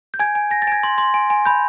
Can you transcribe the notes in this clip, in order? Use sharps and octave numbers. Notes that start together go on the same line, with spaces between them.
G6
G#5 G#6
G#5
G#5 A#6
A6
G#5 G#6
C6
C6
G#5
G#5
B5 G6